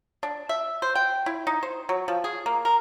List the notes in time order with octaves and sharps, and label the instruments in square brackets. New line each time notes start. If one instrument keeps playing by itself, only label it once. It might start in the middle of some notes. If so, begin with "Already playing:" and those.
[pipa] D4
E5
C5
G5
E4
D#4
C5
F#3
F3
G#4
A#3
A#4